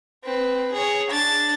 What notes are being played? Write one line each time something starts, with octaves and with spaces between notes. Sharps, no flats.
C4 B4
G#4 C#5
D4 A6